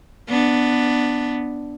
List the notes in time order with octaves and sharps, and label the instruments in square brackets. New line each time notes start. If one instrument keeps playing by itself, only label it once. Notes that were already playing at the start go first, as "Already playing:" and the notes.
[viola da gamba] B3 D4